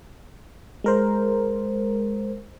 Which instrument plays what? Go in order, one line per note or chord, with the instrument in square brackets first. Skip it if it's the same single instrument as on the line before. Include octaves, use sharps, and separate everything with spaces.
[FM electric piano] G#3 A#4 C5